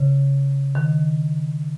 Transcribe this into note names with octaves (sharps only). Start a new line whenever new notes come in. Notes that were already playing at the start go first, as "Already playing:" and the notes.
Already playing: C#3
D#3